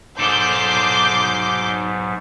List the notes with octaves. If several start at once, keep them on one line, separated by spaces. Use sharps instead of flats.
B1 G#2 A4 C6 D6 G6